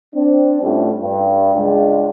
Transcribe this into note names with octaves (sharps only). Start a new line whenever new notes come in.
C4 D4
A2 G3 A3 C4 C#4 F4
G2
C#2 G#3 D4